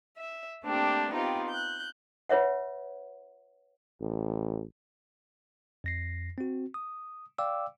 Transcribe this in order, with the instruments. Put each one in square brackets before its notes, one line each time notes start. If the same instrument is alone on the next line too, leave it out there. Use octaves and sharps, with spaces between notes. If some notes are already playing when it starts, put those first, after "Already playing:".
[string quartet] E5
A3 A#3 C4 D4 G4
B3 C4 D#4 F4 G4
F#6 G6
[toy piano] F4 B4 C#5 E5 F#5
[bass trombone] A1
[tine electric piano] F2 A#6 C7
C4 F#4
D#6
D5 F5 G5 D6 E6